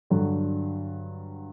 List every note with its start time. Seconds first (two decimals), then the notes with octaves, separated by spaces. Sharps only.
0.10 G2 D3 F#3